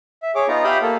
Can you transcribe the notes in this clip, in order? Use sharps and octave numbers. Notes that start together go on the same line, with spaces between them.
E5
G#4 C#5 D6
B3 D#4 F4 A#5
G4 E5 F5 G5 B5 D#6
A#3 A4